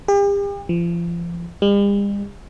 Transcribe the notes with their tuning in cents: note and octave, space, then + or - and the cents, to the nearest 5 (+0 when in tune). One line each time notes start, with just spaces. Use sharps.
G4 +40
F3 -35
G3 +45